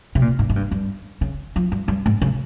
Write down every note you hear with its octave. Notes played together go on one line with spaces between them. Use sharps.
C3
A#2
G#2
G#2
G2
G2
C#3
F3
G2
G2
G#2
C#3